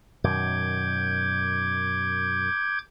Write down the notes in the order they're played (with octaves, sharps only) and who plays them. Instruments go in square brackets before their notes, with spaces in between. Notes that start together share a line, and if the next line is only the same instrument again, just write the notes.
[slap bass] F#2 B2 D#3 [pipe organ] D6 G6 G#6